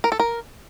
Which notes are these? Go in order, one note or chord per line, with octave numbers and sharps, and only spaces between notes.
A#4
A4
A#4